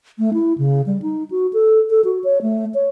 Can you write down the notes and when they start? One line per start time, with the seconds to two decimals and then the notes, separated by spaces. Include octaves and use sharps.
0.19 A3
0.34 E4
0.58 C#3
0.86 G3
1.02 D#4
1.31 F#4
1.53 A4
1.90 A4
2.05 F#4
2.24 C#5
2.42 A3
2.74 C#5